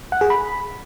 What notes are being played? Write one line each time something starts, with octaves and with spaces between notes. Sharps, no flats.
F#5
G#4
B5